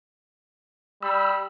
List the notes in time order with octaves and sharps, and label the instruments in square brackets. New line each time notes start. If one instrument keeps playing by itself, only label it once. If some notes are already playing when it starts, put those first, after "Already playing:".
[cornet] G3 [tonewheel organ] B5 E6